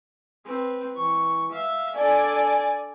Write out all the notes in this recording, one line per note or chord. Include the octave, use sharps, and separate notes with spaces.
C4 B4
E3 C#6
E5 F5
D4 A4 D5 G#5